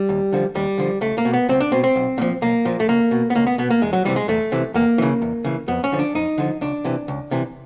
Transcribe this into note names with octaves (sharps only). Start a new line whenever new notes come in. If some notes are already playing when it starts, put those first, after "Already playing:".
Already playing: G3
D#2
D3 F3
D#2 G3
D3 F3
C#2 A3
A#3
B2
B3
C#2 C4
D4
B2 C4
C4
B1
A#2 F3
B1 A#3
A#2 F3
A3
C#2 A#3
B2
B3
C#2 A#3
B3
B2 B3
A#3
E2 G#3
F#3
C3 E3 G3
G#3
E2 A3
C3 E3
E2 A#3
C#3 E3
E2
C#3 E3
F2 B3
C#4
D3 F3
D4
F2 D#4
D3 F3
C#2 D4
C3 E3
C#2
C3 E3